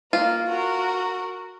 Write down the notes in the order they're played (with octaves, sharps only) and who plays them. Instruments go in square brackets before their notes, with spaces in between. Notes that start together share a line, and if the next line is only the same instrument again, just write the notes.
[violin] A#3 [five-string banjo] F4
[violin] F#4 A#4